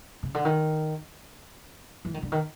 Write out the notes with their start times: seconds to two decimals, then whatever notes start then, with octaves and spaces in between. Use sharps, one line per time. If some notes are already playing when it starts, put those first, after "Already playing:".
0.23 C#3
0.34 D3
0.45 D#3
2.05 E3
2.14 D#3
2.23 D3
2.32 D#3